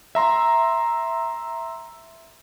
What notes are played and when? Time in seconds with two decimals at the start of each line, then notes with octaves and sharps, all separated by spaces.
0.15 E5 A#5 C6